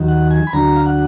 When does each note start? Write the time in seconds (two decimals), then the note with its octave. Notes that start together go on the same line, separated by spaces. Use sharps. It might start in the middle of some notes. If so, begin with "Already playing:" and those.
Already playing: D#2 D#3 F#3
0.08 F#5
0.31 G#5
0.47 B5
0.53 D2 D3 F#3 A#5
0.76 F5
0.86 F#5